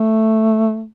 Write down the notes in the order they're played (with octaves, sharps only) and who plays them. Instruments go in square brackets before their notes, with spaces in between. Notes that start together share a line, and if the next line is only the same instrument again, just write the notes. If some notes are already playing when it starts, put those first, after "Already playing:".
Already playing: [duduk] A3